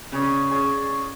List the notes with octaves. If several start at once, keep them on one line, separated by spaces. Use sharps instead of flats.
C#3 C#4 G#4 D5
C#4 G#4 D5